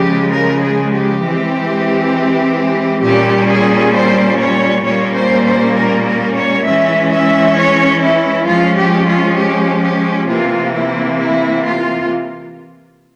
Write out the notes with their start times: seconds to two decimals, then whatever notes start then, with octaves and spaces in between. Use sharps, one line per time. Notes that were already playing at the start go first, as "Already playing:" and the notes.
Already playing: C#3 F3 G#3 G4
0.32 A#4
0.62 G#4
0.92 G4
1.23 E3 G#3 C4
3.03 A#2 G3 C#4 G4
3.49 G#4
3.94 C5
4.40 C#5
4.84 A#2 G3 A#3 C#4 C#5
5.15 C5
5.45 C5
5.76 A#4
6.06 A#4
6.35 C#5
6.65 E3 G#3 C#4 E5
7.11 E5
7.57 C#5
8.02 E4
8.46 F3 G#3 C#4 F4
8.76 G4
9.07 F4
9.37 G4
9.82 G4
10.28 C3 E3 A#3 F4
10.74 E4
11.18 E4
11.64 F4